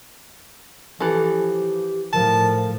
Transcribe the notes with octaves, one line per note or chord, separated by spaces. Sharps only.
E3 F3 G4 A4
A2 F3 A#4 A5